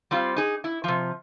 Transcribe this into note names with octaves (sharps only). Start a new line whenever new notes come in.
G3 C4 F4
D#4 G#4
E4
C3 F3